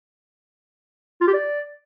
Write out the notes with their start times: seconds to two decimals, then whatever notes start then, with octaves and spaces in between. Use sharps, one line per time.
1.21 F4
1.27 G4
1.34 D5